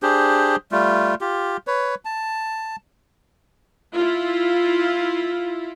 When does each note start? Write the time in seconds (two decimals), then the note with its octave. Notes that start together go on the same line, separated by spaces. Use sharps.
0.03 D4 G4 G#4 C5
0.72 G3 A3 F4
1.21 F4 G4
1.67 B4 C#5
2.05 A5
3.95 E4 F4